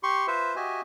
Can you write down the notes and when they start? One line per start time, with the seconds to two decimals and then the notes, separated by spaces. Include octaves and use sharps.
0.03 G4 C6 C#6
0.27 F4 B4 C5 E5
0.56 F#4 G4 D#5 E5 G#5